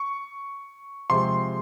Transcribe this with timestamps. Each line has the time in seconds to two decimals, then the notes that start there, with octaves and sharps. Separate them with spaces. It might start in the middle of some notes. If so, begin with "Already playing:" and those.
Already playing: C#6
1.10 C3 F3 G#3 C6